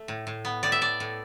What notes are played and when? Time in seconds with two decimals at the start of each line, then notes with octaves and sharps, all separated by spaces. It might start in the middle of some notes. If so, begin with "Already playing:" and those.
Already playing: A3
0.08 A2
0.27 A2
0.45 B3
0.63 A2 D5
0.72 E5
0.81 A3 D5
1.00 A2